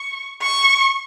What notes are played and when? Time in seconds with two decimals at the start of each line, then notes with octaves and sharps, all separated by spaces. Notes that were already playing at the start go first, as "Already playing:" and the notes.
Already playing: C#6
0.42 C#6